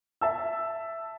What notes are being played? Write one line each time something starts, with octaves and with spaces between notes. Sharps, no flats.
E5 A5 E6